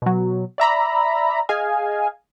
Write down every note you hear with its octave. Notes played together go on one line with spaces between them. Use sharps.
B2 F#3
D5 E5 A#5 B5
G#4 D#5 F5 G#5